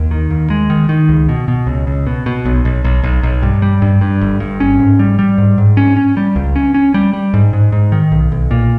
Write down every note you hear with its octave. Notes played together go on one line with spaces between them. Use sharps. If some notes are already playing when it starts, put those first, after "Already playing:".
Already playing: D#2
D#3
D#2
G#3
D#3
D#3
C#2
B2
B2
C#2
C#2
B2
B2
B1
B1
B1
B1
B1
G2
G3
G2
G2
G1
G2
C#4
G#2
G3
G3
G#2
G#2
C#4
C#4
G3
C#2
C#4
C#4
G3
G3
G#2
G#2
G#2
D#3
B1
B1
A#2